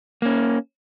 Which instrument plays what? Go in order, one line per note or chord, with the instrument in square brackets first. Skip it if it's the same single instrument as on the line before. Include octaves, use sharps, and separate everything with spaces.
[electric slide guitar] A#3 C#4